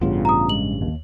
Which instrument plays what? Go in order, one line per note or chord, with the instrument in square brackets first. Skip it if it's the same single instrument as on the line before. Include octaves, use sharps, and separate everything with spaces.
[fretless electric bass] A1 G2 C#3 [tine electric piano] B3 F4
[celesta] A#5 D#6
[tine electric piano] G#3 [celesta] F#7
[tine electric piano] D#2